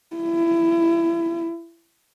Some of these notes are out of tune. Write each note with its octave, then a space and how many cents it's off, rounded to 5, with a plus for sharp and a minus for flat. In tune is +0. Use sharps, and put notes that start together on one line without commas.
E4 +25